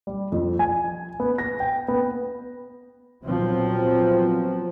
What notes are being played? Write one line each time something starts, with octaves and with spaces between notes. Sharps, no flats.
G3
F2
G#5
B3
A#6
G5
B3
A#2 F3 F#3 B3 C4